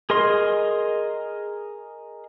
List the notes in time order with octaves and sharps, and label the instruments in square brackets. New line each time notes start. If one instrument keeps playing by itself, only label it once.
[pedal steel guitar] G#4 A#4 D#5 C6